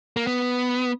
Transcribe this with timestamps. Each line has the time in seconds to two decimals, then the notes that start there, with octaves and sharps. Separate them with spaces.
0.17 A#3
0.27 B3